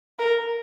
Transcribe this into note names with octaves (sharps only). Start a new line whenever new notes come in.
A#4